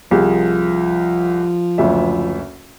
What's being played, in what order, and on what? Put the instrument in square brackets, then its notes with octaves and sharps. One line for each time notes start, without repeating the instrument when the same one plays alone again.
[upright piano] C2 G#4 [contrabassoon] F3
[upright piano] F#1 D2 E5